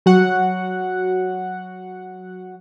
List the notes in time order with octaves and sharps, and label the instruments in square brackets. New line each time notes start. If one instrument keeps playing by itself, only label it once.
[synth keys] F#3 F#4 F#5